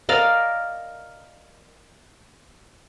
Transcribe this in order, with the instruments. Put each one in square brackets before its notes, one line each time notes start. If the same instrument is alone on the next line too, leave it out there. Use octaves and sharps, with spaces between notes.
[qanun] A#4 D5 D#5 F5